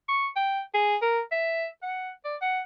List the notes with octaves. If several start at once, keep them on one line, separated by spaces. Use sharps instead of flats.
C#6
G5
G#4
A#4
E5
F#5
D5
F#5